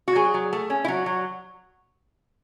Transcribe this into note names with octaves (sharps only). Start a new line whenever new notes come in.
F#4
F#3 G#4
F#3
A3
C#4
E4
F#3 F#4
F#3